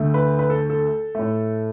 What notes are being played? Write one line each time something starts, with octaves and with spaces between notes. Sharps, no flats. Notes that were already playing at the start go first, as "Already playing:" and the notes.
Already playing: D2 D3 A3
B4
B4
A4
A4
A2 A3